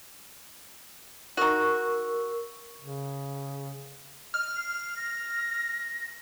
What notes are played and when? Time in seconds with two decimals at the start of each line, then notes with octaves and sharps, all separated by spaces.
1.37 D#4 F#4 A#4 C#6 E6
2.81 C#3
4.34 D#5 F6
4.56 C7
4.96 A#6